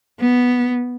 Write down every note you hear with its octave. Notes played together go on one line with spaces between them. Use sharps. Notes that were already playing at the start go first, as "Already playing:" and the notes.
B3